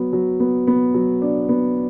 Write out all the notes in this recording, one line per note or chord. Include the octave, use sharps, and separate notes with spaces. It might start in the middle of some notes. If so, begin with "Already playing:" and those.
Already playing: F#3 B3
F#3
B3
B3
F#3
D4
B3